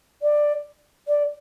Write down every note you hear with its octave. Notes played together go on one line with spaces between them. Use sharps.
D5
D5